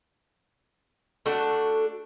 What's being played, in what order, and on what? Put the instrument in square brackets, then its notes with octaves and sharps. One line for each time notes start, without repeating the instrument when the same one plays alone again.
[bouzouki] A3 D4 F#4 A4